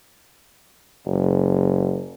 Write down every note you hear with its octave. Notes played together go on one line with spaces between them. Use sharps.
F#1